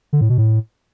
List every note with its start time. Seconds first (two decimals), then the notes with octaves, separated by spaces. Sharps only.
0.13 D3
0.21 A2
0.30 B2
0.38 A2